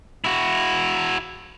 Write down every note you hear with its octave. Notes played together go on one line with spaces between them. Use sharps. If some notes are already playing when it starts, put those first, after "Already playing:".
E4 F#4